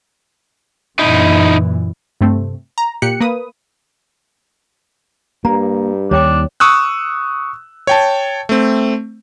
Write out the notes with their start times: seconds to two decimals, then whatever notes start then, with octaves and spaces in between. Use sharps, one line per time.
0.99 F#2 A#2 E3 D#4 E4
2.21 G2 C3 A3 C4
2.78 A#5
3.02 A#2 G4 F#6 C#7
3.20 A#3 B4 D#6
5.45 G2 A#3 A#5
6.11 D#2 G3 D4 C#5 G5 D6
6.60 C#6 D#6 E6 F#6
7.87 C#5 G5 A5
8.49 A3 C4